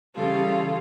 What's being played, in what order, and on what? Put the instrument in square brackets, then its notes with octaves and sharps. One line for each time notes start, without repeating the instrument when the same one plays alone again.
[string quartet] C#3 E3 G3 F4 A4